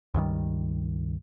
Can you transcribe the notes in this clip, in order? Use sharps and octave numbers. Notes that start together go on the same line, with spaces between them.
C#2 G2 D#3 G3